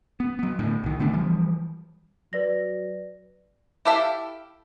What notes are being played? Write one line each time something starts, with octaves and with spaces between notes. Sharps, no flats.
B3
F#3 B3
A2 D3
B1 D#3
D3 A3 B3 D4
E3 F3 G3
F#3 B4 D5 A#6
E4 G4 A4 E5 F5